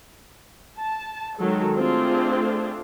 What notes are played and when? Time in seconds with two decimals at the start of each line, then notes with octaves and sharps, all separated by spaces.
0.78 A5
1.37 D#3 F#3 G#3 A4
1.76 A3 C4 D4 F4 G#4